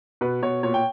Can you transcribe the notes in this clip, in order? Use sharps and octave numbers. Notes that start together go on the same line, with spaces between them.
B2 B4
B2 C#5
A#2 C#5
G5